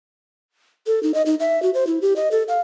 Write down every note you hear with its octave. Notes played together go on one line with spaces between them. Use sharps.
A4
D#4
D#5
D#4
E5
F#4
C5
E4
G4
D#5
A4
F5